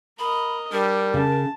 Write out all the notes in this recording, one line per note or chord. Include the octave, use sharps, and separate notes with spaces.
A#4 D#5 B5
G3 D4 A#4
C#3 A5